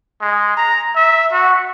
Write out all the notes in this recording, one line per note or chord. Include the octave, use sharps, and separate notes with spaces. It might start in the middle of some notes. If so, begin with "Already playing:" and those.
G#3
A#5
E5
F#4